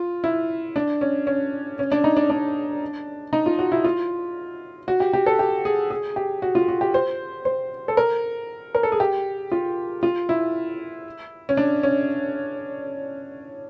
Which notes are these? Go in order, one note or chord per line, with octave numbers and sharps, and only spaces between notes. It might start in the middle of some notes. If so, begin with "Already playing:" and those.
Already playing: F4
E4
D4
C#4
C#4
C#4
D4
D#4
D4
D4
D#4
F4
F#4
E4
F4
F#4
G4
G4
A4
G4
G#4
G#4
G4
F#4
F4
F#4
G4
C5
C5
A4
A#4
A#4
A4
G#4
G4
F4
F4
E4
C#4
D4
C#4